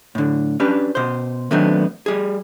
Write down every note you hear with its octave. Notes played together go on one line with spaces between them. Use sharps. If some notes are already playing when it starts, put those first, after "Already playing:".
A2 D3
C#4 D4 G4 B4
B2 C5
D#3 F#3 A3 B3 C4 D4
G3 G#4